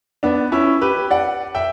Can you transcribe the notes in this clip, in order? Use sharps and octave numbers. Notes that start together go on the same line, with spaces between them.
B3 D4
C#4 E4
G4 B4
D5 F#5
E5 G5